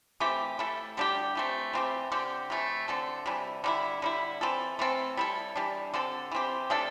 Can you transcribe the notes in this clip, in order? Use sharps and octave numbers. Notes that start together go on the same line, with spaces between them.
E3 A3 C4 G4
A3 E4 A4
D3 G3 D4 G4
E3 A3 C4
E3 C4 G4
D3 C4 G4
C3 E3 A3
D3 C4 A4
C3 E3 G3
D3 G3 E4
D3 G3 E4
E3 C4 A4
E3 A3 C4 A4
G3 E4 A4
E3 G3 D4
D3 C4 A4
E3 C4 G4
C3 A3 D4 A4